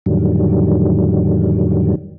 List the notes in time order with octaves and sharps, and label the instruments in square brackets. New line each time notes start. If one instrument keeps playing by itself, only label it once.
[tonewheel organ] F2 A2 D3 D#3 F#3 G3